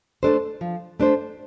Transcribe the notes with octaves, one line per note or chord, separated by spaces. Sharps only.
A3 D4 A4 C5
F3
A3 D4 A4 C5